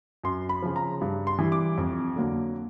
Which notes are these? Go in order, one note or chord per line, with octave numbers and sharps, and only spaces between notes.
F#2 C6
B5
C#3 F3
A#5
G2
C6
E3 G3
D6
F2
D3 F#3 A#3